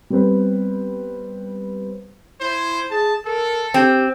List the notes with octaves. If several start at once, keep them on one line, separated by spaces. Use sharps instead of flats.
G3 B3 C4 B4
E4 C5
G#4 A5
A4 A#4
C4 G4